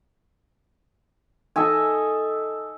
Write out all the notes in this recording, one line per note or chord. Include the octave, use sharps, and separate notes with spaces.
A4 D#5 E5 G#5